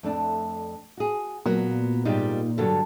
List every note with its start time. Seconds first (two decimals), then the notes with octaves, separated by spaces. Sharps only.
0.03 F2 A3 D4
0.97 F#4 G#4
1.46 A#2 F#3 B3 A#4
2.05 G#2 G3 D#4 F4 G4
2.58 G2 D3 F#3 A4